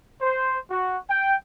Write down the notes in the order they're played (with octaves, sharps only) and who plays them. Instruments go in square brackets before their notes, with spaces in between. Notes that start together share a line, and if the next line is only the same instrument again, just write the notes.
[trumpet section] C5
F#4
G5